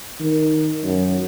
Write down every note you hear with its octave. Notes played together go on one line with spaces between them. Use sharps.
D#3
F#2